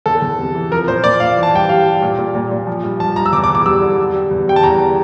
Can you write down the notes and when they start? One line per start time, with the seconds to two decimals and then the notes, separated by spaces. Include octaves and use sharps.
0.06 E2 A4
0.22 E2
0.38 C3
0.55 E3
0.71 F3 A#4
0.87 A#2 C5
1.04 A#2 D5
1.20 A#2 F5
1.37 E3
1.43 A5
1.53 G2 G5
1.69 G3 F5
1.86 G3
2.02 A#2
2.19 A#2
2.35 A#2
2.51 A#2
2.67 F3
2.84 G2
3.00 F3 A5
3.16 G2 A#5
3.26 E6
3.32 E2 D6
3.44 D6
3.49 E2
3.55 D6
3.66 G3 E6
3.82 D3
3.98 G3
4.15 G3
4.31 E2
4.48 G3 G5
4.56 A5
4.63 E2 A#5